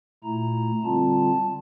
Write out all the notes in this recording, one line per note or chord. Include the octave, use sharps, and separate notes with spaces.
A#2 A3 E4 A#5
D3 G3 C4 F4 A5